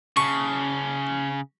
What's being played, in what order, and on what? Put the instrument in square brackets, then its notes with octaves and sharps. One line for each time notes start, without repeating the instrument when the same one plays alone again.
[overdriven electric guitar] C#3 [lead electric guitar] C#4 A5 [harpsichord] C#6